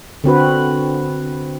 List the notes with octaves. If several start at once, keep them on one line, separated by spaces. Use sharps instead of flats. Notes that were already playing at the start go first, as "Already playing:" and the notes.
D3 C4 F#4 B4